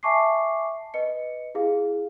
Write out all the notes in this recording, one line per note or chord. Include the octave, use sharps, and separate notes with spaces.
E5 G#5 A5 C#6 D6 C7
B4 D#5 C#7
E4 G4 G#4 F5